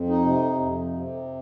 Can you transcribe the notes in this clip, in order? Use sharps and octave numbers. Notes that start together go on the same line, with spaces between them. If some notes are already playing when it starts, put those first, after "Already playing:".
Already playing: F2
D#4
C3
F2
C3